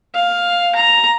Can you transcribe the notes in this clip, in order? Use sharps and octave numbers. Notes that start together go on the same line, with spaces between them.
F5
A#5